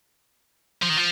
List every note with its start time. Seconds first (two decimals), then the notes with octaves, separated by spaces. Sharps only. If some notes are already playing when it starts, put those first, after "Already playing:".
0.82 F3
0.89 D#3
0.97 F3